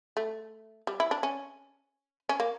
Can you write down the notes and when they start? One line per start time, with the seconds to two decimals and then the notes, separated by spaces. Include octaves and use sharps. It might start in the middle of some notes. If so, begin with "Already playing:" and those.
0.17 A3
0.87 G3
1.00 E4
1.11 D4
1.23 C#4
2.29 C#4
2.40 A#3